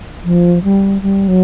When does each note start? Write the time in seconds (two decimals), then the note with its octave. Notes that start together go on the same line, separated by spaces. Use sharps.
0.25 F3
0.64 G3
1.02 G3
1.28 F#3